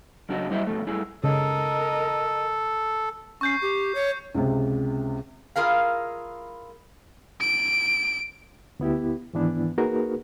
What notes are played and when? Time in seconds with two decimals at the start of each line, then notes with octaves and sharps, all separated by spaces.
0.29 F#2 C#3 D4 F#4 D#5
0.50 F#3 G3 E4 C5 D#5 E5
0.67 B2 F3 A3
0.86 G2 A3 E4 G#4
1.24 C#3 A4 A#4 D#5
3.41 C#4 C#6 G6 C7
3.62 G4
3.95 C#5
4.35 C#2 C3
5.56 E4 F4 G#4 A#4 F5
7.41 D7
8.80 D2 B3 E4 G4
9.33 G#2 D#3 E3 B3 D4 E4
9.78 A#3 D#4 F#4 G#4 A#4 B4